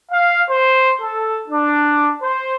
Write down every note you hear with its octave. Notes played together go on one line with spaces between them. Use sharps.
F5
C5
A4
D4
C5